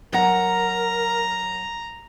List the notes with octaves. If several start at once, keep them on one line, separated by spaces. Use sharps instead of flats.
F#3 A#4 F#5 A#5